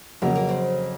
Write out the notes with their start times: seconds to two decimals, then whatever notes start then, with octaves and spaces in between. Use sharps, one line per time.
0.22 F2 C#3 F#3 A#3
0.35 A#3
0.49 C4